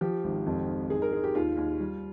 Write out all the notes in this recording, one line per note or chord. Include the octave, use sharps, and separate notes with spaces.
F3 G4
G#1
F2
D#3
G#2 G#4
A#4
G#3 G#4
G4
D#2 F4
D#2
G3